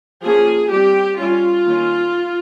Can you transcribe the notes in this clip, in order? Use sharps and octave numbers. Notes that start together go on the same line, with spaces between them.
F3 A#3 C#4 G#4
G3 C4 G4
G3 C#4 F4
D#3 A#3 C#4